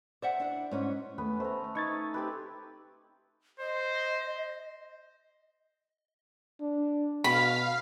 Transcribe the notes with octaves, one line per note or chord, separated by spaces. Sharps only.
C5 D5 E5 F#5
D4 E4
G#2 C#4 E4
D#2 A3 B3 C#4 B4
A3 C5 A#5
D#4 B4 C#6 G#6 A6
C4 G4 B4
C5 D#5
D4
B2 F5 B5